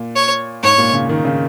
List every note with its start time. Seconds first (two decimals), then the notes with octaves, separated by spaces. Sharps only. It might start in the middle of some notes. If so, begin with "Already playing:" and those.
Already playing: A#2
0.16 C#5
0.63 G#2 C#5
0.78 A#2
0.93 C#3
1.09 D#3
1.25 C#3